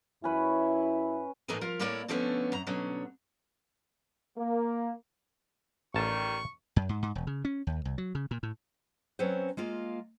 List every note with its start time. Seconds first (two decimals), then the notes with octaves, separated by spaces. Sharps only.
0.24 F#2 C#4 E4 B4 C#5
1.48 A2 E3 D#4 A4 A#4 G#5
1.61 F3 F4 A#4
1.80 A2 A#3 E4 A#4 C#5 D5
2.08 B2 D3 F3 A3 B3 C#4
2.52 F#2 A#5
2.67 B2 D3 F#3 C#4
4.38 A#3
5.94 A1 D#3 G3 A5 C#6
6.76 F#2
6.89 G#2
7.03 G#2
7.15 E1
7.27 C#3
7.45 C#4
7.67 D#2
7.85 C2
7.98 F#3
8.15 C#3
8.31 A#2
8.43 A2
9.19 F#3 C4 C#4 B4 C5
9.57 G#3 A#3 F4